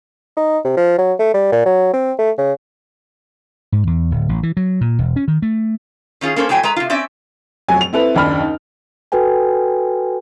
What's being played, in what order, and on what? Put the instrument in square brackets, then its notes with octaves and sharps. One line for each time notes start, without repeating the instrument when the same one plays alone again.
[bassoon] D#4
C3
F3
F#3
A3
G3
A#2
F#3
C4
A3
C#3
[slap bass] G#2
E2
D1
A1
E3
F#3
A#2
E1
C#4
D#3
A3
[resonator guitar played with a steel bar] D#3 C#4 F4 G#4
A#3 C#4 A4 C5
F2 A2 F#3 G5 G#5
G#3 B4 A#5
C3 F4
C4 C#4 D5 E5
[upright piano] F1 F#3 G#5
F7
C4 E4 A4 B4
F#1 D#2 D4 B5 F6
D#4
[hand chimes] F#4 A4 B4 G5 G#5